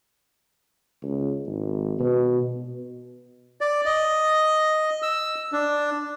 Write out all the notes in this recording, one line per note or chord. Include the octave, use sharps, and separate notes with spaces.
C#2
G#1
B2
D5
D#5
E6
D4